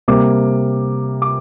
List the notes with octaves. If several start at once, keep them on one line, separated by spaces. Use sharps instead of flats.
C3 G3 A#3 D6
D6